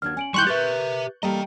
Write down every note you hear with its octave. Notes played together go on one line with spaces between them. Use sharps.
D#2 D4 F#4 F6 G#6
C#4 G#5 D7 F#7
D#3 G3 E4 G5 C6 C#6 F#6 G6
G4 A#4 B4 E5 A6
G3 A#3 A4 D#5 G5 A#5